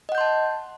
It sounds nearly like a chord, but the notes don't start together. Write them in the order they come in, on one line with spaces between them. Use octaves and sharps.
D#5 F#5 G6 C6 A5